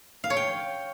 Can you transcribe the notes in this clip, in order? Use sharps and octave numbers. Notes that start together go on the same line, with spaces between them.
F5
C#5
G5